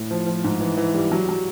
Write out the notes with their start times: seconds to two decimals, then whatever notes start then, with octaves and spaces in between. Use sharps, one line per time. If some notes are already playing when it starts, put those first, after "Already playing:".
Already playing: A2
0.11 F3
0.27 F3
0.44 G#2
0.61 E3
0.77 E3
0.94 G3
1.12 F#3
1.29 F#3